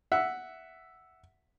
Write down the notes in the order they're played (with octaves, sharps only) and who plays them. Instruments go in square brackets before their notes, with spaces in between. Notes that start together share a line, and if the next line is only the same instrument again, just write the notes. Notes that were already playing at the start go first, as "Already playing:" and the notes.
[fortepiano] E5 F#5